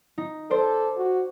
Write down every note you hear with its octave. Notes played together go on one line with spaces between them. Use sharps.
D#4
A4 C5 D5
F#4